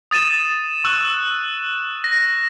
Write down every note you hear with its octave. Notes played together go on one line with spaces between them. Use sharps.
D#6 A6 D#7 E7
C#6 E6 F#6
A#6